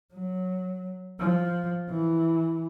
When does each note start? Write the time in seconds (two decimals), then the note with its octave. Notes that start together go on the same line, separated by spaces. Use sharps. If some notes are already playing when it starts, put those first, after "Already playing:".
0.13 F#3
1.19 F3
1.90 E3